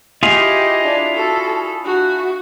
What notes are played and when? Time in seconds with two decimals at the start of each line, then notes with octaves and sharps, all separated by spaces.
0.23 E4 F4 G4 G#4 D#5
0.83 D4
1.16 F#4 A4
1.85 D4 F#4